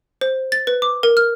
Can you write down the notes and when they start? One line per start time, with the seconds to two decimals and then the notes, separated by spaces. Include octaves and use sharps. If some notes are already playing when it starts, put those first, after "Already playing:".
0.21 C5
0.52 A6
0.67 B4
0.82 D6
1.03 A#4
1.17 F6